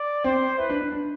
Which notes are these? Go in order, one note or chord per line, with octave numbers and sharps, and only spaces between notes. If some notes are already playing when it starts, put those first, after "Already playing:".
Already playing: D5
C4 C5
E4 B4
D4
D4
D4